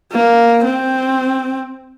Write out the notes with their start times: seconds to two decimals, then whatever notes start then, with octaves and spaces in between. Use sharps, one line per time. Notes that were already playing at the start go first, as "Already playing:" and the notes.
0.12 A#3
0.64 C4